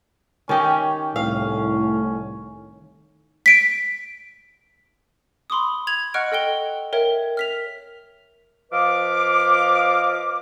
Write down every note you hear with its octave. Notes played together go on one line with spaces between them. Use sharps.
D#3 C#4 G4
C#4
C2 A2 F5
B6 D7
B5 C6 D6 D#6
G#6 F7 F#7
D#5 F#5 C#6 F6 F#6 D7
A4 D#5 G5 G7
A#4 C#5 E5 G5
F6 B6 F7
F3 B4 D#5 F5 D6